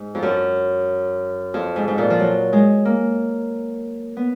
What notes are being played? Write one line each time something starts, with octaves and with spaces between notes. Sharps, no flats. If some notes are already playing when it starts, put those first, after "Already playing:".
Already playing: G#2
F2
F#2
F2
G#2
G#2
A#2
F3
F#3
G#3
A#3
B3